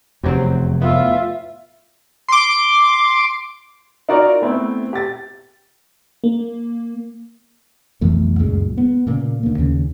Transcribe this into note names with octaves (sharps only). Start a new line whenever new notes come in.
F1 E2 C3 F#3 C4
A2 B3 F4 E5
C6 D6
D#4 F4 F#4 A#4 D5 A#5
A3 B3 C4 E4
G4 A6
A#3
B1 F2 E3 A3
C#2 F#2 A#2 G#3
B3
A#2 C#3 A#3
D2 A#3
D#2 C#3